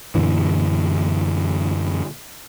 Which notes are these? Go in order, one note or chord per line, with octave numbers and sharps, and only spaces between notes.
F#2 A#2 D3 E3